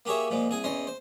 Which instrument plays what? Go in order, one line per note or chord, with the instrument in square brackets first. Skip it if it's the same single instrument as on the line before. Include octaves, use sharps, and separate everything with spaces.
[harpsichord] A#3 G4 G#4 C#5 E5
A#2 F3 G#3
C2 G#4 G#5
E2 C#4 D#5 C6
C5